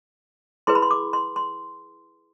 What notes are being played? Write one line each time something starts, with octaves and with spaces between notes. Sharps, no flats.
E4 G#4 B4 C6
B5
C6
D6
C6
C6